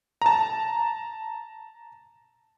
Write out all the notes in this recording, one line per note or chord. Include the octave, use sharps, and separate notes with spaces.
A5 A#5